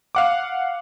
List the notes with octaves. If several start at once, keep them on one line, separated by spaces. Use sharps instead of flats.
F5 F#5 D6